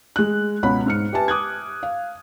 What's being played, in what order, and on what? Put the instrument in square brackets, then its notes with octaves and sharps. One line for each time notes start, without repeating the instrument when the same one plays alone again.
[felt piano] G#3 F#6
C#2 B2 C#5 F#5 B5
G#2 F6 C#7
G4 B4 E5 G#5 A5
D6 D#6 F#6 G#6
F5